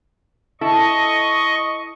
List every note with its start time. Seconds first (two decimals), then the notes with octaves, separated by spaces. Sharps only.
0.61 E4 A4 D#5 C#6